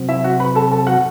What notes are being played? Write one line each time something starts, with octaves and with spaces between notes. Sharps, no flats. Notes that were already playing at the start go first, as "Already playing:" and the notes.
Already playing: C3 F#3 C4
E4 E5
F#4 F#5
B4 B5
A4 A5
A4 A5
F#4 F#5